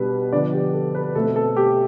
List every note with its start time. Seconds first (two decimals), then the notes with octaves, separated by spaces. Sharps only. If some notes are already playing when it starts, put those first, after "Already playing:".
Already playing: B2 G3 B3 D4 B4
0.32 D3 F3 B3 D4 D5
0.53 G4
0.74 A4
0.95 B4
1.15 B2 A3 C4 A4
1.36 A4
1.57 G4